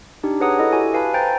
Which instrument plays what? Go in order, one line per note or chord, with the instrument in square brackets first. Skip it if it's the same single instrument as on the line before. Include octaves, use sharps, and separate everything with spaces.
[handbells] D4 D#4 G4
G#4 B4 C#5 F#5 A#5 D#6
E4 A4 D#5
F#4 G4 G#5
B4 F5 G#5 A5 B5
C5 G5 G#5 A#5 G6 A6